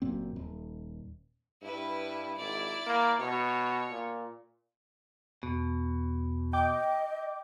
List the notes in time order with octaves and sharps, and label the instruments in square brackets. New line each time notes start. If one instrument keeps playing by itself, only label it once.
[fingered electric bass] F#1 F#2 A#2 C4
D#1
[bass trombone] G2 [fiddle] E4 B4
[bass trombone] G#1 [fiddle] E4 D5
[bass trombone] A#3
[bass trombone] B2 [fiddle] C#5
[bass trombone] A#2
[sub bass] E2 [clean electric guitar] B2
[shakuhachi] D#5 [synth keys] G5 D6